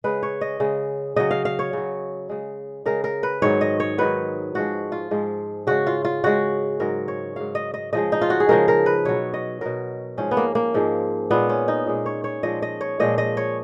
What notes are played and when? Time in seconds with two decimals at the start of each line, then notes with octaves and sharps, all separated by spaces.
0.04 C#3 G#3 B4
0.23 C#5
0.41 D#5
0.60 C#3 G#3
1.16 C#3 F#3 D#5
1.31 F5
1.45 F5
1.59 C#5
1.73 C#3 F#3
2.29 C#3 G#3
2.86 C#3 G#3 A#4
3.04 A#4
3.23 B4
3.42 G#2 D#3 F#3 C#5
3.61 D#5
3.80 C#5
3.98 G#2 D#3 F#3 B4
4.54 G#2 F3 G#3 F#4
4.92 F4
5.11 G#2 F3 G#3
5.67 C#3 G#3 F#4
5.87 F4
6.05 F4
6.24 C#3 G#3 F#4
6.80 G#2 F#3 A#4
7.08 C#5
7.36 G#2 F#3 F5
7.55 D#5
7.74 D#5
7.93 C#3 F3 G#3 D#5
8.12 D#4
8.21 F4
8.30 F#4
8.40 G#4
8.49 C#3 F3 G#3 A#4
8.68 A#4
8.86 B4
9.05 B2 F#3 C#5
9.34 D#5
9.61 B2 F#3 A#4
10.17 G#2 F3 G#3 C#4
10.31 B3
10.37 A#3
10.55 A#3
10.74 G#2 F3 G#3
11.30 A#2 G#3 B3
11.49 C#4
11.68 D#4
11.87 A#2 G#3
12.06 C#5
12.24 C#5
12.43 A#2 F3 G#3 D#5
12.62 D#5
12.81 C#5
13.00 A#2 F3 G#3 D#5
13.18 D#5
13.37 C#5